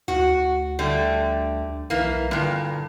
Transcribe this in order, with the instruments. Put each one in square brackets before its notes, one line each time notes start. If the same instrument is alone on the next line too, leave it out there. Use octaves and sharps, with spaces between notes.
[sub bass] D2 [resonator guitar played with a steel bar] F#4
[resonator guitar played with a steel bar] D3 G3 A3
[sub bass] B1 [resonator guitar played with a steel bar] E3 A#3
[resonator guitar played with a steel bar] G2 A#2 [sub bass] D3